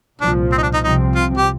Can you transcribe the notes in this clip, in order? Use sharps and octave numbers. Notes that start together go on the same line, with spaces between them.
C2 A#2 F3 D4
C4
D#4
D4
D#4
C2 C3 F3 C4 D#4
F4
G4